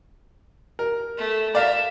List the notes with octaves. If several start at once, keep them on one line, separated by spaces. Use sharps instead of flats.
A#4
A3
A#4 D5 E5 F5